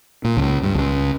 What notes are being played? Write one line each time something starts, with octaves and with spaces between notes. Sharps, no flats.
A#2
C#2
G2
C#2